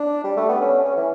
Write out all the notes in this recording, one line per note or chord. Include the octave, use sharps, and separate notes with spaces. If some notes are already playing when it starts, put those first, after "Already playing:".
Already playing: D4
G3
A3
B3
C#4
C#4
E3